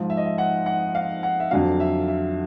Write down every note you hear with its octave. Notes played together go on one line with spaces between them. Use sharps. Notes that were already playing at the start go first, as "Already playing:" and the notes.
Already playing: G#2 F3
E5
D#5
E5
F#5
F#5
F5
F#5
E5
F2 D3 F#3 F5
E5
E5